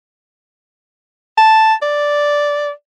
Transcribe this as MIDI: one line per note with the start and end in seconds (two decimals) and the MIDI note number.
1.38 1.74 81
1.82 2.71 74